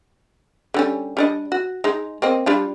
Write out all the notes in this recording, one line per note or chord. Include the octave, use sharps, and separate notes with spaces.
D3 G3 C#4
G3 D4 D#5
F#4
G#3 D#4
A#3 C4 D#5
G3 D4 F4